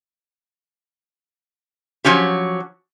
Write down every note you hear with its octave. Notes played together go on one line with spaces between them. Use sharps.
F3 F#3 C#4 G4